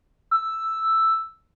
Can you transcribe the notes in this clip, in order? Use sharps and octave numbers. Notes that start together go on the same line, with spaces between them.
E6